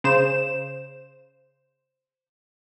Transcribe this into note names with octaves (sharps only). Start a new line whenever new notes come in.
C#3 C5 E7